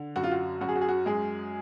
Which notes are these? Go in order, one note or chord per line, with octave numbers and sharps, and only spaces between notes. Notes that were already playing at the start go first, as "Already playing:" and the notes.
Already playing: D3
F#2 F#4
F4
F#4
F#2 F#4
G#4
F#4
G#4
F#4
F#2 G#3 G#4